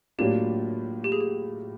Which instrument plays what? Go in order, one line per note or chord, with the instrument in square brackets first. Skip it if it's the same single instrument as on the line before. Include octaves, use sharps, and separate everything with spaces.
[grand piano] A2 F#3 A#3 D4 F4 [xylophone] G4
[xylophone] G4
G#4
G4